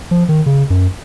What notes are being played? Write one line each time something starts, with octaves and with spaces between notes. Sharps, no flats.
F3
D#3
C#3
F#2